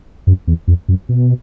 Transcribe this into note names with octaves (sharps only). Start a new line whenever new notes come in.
F#2
E2
F2
F#2
B2